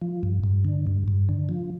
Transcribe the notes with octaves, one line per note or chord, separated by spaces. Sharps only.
F3
G2
G2
D3
G2
G2
D3
F3